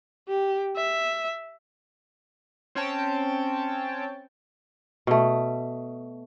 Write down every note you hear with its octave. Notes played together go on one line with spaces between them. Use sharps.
G4
E5
C4 C#4 C#5 G5 A5
B2 A3